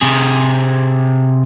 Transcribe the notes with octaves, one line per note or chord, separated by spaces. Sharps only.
C3 G#4